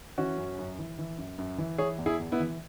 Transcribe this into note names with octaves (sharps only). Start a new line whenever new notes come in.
E3 C#4 F#4
F#2
F#2
E3
E3
F#2
F#2
E3
E3 G#4 C#5
E2
E4 G#4
E2
B3 E4
E3